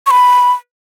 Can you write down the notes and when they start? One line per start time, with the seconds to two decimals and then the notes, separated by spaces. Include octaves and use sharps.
0.06 C#6
0.11 B5